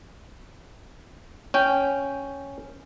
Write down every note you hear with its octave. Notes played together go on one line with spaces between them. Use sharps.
C#4 G5